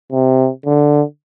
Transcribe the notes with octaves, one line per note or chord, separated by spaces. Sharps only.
C3
D3